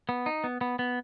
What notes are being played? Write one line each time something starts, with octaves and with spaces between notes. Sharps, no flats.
B3
D#4
B3
B3
B3